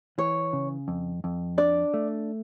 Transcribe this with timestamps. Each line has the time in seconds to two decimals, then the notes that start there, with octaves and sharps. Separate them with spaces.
0.18 E3 C#5
0.53 C#3
0.88 F2
1.24 F2
1.58 D4 D5
1.94 A3